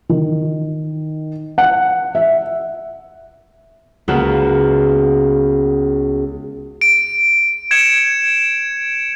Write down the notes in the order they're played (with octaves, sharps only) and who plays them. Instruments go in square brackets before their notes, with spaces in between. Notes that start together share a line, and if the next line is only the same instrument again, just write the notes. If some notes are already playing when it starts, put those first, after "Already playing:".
[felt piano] D#3
F#5
E5
[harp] C#2 A#3 B3 F#4 E7
[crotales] D7
G#6 C#7 E7